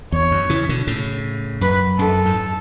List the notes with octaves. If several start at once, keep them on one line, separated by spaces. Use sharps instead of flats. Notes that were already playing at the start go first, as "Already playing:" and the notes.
E2 C#5
F#2
C#3 E3
B2 D3
A2 C#3
F#2 B4
F#2 A4
G#2